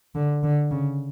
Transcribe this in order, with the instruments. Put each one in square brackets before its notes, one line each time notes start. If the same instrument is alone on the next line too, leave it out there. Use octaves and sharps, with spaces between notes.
[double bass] D3
D3
C#3